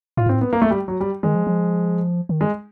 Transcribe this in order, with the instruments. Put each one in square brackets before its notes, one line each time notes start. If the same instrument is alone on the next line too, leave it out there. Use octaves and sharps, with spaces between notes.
[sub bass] A2 [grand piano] F4
[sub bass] G#2
[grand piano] C4
[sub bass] A2
[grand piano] B3
A#3
A3
G3
F#3
G3
[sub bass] D#3 [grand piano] G#3
[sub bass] F3
F3
D#3
[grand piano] G#3